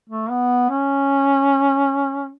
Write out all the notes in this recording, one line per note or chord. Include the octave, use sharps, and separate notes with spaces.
A3
B3
C#4